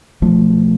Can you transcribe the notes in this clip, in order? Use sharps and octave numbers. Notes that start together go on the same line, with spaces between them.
B1 B2 F3 A3